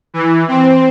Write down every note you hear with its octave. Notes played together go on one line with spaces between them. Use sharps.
E3
C4